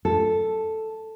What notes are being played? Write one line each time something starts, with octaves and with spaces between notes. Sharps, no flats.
A4